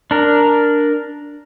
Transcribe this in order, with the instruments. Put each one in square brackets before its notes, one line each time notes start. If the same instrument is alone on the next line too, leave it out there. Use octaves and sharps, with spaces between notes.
[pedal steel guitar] D4 A#4